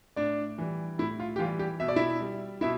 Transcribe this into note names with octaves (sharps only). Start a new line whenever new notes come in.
A2 D4 D5
E3 G3
A2 E4
F4
G4
E3 F4
G3
G3 G4
B2 E5
D5
E4 E5
G3
B2 E4 E5